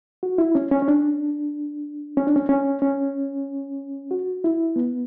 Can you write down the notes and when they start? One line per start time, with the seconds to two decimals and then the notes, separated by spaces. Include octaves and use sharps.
0.23 F#4
0.38 E4
0.55 C#4
0.71 C#4
0.82 C#4
0.88 D4
2.17 C#4
2.27 D4
2.36 C#4
2.49 C#4
2.82 C#4
4.11 F#4
4.44 E4
4.76 B3